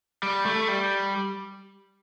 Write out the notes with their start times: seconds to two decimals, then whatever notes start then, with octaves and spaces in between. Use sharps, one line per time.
0.23 G3
0.46 A3
0.68 G3